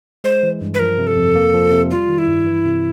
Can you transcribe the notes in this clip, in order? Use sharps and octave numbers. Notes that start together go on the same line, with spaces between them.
G#3 C5
E3
G2
B4
F3 A#4
C3
A4
F2
A#3
F3
C3
G3 F4
D#3
E4
G2
E3
C3